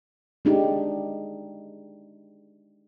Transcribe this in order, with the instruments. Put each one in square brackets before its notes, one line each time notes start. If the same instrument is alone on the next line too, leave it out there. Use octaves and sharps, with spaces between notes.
[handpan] G#3 D4 D#4 G4